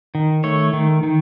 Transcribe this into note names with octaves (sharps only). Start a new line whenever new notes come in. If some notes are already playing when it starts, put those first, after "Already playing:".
D#3
A3 C#5
D#3
D#3